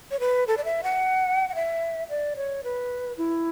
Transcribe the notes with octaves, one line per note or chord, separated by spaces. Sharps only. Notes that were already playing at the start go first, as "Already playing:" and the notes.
C#5
B4
A4
D5
E5
F#5
F#5
E5
D5
C#5
B4
E4